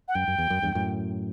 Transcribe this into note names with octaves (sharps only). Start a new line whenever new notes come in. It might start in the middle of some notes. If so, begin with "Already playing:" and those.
F#5
F#2 G5
F#2
E2
F#2
E2 G2
F#2 A2